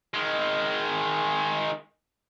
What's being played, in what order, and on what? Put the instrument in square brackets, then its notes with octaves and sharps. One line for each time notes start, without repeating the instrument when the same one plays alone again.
[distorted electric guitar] D#3 G#3